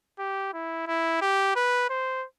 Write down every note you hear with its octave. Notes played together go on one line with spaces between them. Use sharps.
G4
E4
E4
G4
B4
C5